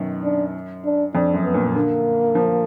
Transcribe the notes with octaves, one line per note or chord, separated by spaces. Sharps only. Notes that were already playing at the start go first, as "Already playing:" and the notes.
Already playing: F#2 B2 D#3
D4
D4
F2 D4
F#2
B3
A#2
D3 A#3
F3